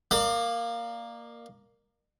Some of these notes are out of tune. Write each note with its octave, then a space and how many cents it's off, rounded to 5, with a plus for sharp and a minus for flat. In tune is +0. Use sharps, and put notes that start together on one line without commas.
A#3 +0 D5 +45